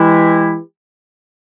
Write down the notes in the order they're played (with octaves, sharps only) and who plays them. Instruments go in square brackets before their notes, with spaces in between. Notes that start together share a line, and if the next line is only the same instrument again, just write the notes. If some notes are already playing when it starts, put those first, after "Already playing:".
Already playing: [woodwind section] E3 G#3 E4 G4